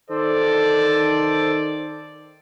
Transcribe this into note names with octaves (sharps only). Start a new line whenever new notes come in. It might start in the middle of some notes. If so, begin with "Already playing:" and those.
D#3 A4 C5 D5